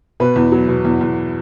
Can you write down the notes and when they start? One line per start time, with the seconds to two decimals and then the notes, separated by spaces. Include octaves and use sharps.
0.20 B2 B4
0.36 E2
0.52 F#3
0.68 B2
0.85 E2
1.01 E2